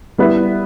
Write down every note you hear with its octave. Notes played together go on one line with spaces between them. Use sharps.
G3 B3 E4 B4